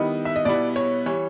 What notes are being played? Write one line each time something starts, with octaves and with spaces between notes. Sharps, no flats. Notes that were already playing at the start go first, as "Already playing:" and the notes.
Already playing: D#3 G3 B3 E4 D#5
E5
D#5
B2 G3 B3 E4 D5
C#5
E3 G3 C#5